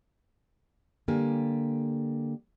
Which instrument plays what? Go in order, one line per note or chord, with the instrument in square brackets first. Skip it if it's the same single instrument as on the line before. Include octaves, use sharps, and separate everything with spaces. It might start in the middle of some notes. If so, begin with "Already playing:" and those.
[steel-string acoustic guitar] D3 G3 A#3 G4 G#5